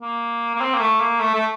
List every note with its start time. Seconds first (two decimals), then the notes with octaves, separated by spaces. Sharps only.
0.02 A#3
0.55 A#3
0.61 C4
0.75 A#3
0.80 A3
1.01 A#3
1.20 A3
1.35 A3